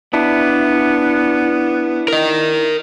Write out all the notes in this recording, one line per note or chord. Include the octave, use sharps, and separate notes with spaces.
B3 D4 E4
A#4 D#5